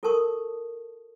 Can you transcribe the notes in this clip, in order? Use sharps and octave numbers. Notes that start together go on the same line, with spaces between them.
F4 A4 A#4 A5 C#6 D#6